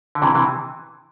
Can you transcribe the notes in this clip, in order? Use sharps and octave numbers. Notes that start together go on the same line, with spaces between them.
D3
C3 E3
C3 E3